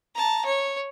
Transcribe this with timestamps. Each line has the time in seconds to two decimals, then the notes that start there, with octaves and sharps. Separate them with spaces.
0.15 A5 A#5
0.45 C#5